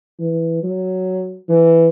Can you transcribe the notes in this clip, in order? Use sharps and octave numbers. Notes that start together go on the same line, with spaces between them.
E3
F#3
E3